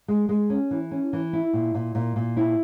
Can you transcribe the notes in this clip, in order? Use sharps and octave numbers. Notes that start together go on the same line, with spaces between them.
G#3
G#3
C#4
E3
C#4
E3
E4
A#2
A#2
A#2
A#2
E4